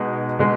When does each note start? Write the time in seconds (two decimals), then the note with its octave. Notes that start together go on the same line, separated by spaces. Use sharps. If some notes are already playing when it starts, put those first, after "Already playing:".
Already playing: B2 G#3 D#4
0.39 B2 G#3